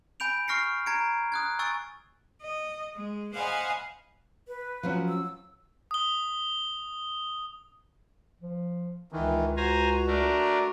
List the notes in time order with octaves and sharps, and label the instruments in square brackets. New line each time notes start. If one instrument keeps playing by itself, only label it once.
[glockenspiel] G#5 B5 G6 D7 F7
C#6 F6 A#6 C7 C#7
A#5 G#6 A#6 C#7 D7
D#6 F#6 G#6
G#5 C#6 E6 A6 D7
[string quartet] D#5
G#3
C5 D#5 F5 F#5 G#5 B5
[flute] B4
[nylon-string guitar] F3 F#3 C#4
[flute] E6
[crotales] D#6 G7
[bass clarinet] F3
[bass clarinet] C#2 [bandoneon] D#3 E3
[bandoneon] F#4 [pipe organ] C5 G#5 A#5
[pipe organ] A3 D4 A#4